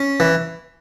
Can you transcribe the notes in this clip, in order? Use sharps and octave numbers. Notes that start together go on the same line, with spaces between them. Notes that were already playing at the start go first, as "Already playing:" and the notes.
Already playing: C#4
E3